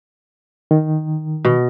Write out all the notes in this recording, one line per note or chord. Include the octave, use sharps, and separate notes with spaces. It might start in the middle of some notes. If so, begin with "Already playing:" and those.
D#3
B2